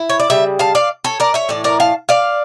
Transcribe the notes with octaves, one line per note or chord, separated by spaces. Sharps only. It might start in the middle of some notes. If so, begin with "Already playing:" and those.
Already playing: E4
C#5
D5
C#3 G3 E5
F5 A5
D5 F5
A4 C#5
A#4 D5
C#5 E5
A2 E3 A3 D5
A#4 D5
F5 A5
D5 F5